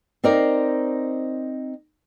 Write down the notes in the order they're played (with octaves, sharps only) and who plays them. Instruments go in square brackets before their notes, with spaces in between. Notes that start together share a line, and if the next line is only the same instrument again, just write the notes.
[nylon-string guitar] C4 D#4 A#4 C5 D5